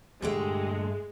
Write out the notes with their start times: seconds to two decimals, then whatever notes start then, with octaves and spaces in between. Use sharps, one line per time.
0.22 G2 A#2 D3 G#3 A3 G4